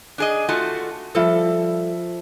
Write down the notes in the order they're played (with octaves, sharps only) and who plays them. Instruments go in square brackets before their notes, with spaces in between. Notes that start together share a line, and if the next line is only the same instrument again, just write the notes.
[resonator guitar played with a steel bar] D4 G#4 D#5
A3 F4 F#4
[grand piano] F3 E5 [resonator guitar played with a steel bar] G3 A4